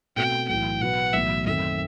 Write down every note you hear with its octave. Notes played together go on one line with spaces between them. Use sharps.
B2 A3 C4 F#4 G5
B1 A2 E3 G5
B2 F#3 B3 F#4 B4 F#5
B1 A2 E3 B3 E5
F#2 D#3 A3 C4 E5